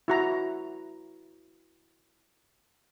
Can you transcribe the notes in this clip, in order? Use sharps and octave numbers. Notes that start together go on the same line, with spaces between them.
E4 F#4 A#5